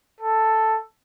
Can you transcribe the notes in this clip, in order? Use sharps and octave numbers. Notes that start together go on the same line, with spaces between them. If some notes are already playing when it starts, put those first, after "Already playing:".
A4